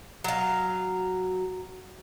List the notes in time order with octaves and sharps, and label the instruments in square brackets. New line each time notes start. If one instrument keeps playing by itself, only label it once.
[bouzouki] F#3 F5